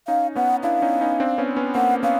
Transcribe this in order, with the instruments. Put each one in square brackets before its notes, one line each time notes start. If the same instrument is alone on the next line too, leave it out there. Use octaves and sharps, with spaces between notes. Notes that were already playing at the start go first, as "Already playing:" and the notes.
[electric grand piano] C#4 D#4 [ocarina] F5
[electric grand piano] B3 C#4 [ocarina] F#5
[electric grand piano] D4 E4 [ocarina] F5
[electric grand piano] C#4 D#4
C#4 D#4
C4 D4
B3 C#4
B3 C#4
[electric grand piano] A#3 C4 [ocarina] F#5
[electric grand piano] B3 C#4 [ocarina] F5